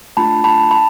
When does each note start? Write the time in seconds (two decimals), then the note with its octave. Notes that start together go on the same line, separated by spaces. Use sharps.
0.17 A3 D4 F4 A5 B5
0.44 A5 B5
0.71 A5 B5